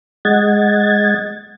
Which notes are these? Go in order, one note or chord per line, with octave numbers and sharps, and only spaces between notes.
G#3 D#5 F#5 G#6 A6